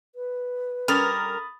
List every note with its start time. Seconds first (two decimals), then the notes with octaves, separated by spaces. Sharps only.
0.15 B4
0.88 G3 C#4 A4 A#4 B5 D#6 A6